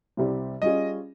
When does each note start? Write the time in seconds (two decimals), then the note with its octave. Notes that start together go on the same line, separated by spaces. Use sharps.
0.17 C2 C3 G3 C4 G4
0.62 G3 C#4 F4 G#4 D#5